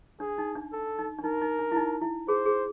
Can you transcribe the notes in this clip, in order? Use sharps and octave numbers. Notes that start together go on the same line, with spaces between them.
D4 G#4
D#4
D4
A4
D#4
D4
D#4 A#4
D#4
D4
E4
D#4
E4
G#4 C5
G#4